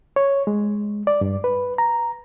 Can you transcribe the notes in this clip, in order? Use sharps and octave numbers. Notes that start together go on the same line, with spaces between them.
C#5
G#3
D5
G2
B4
A#5